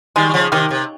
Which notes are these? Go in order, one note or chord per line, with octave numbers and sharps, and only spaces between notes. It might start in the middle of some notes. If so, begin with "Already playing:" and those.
D#3 G3 G#3
G3
C#3 F3
C3 D#3 D#4 G4 A#4
C3